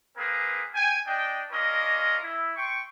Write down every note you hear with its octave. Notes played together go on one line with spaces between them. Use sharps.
A#3 C4 G#4 A#4 B4
G5 G#5
D4 D#5 G5
C#4 D4 F4 A#4 D#5
E4
G5 C6 C#6